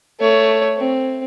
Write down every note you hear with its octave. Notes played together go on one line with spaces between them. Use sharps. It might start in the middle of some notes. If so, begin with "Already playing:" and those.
A3 C#5
C4